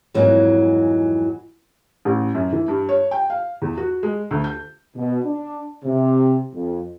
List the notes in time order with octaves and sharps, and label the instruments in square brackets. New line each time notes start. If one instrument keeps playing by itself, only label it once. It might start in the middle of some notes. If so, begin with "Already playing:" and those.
[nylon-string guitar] F2 G#2 E3 F#3 A#3
[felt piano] A1
F#2
E3
G2
C#5
G5
F5
E2
F#4
G#3
D2
G6
[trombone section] B2
D4
C3
F2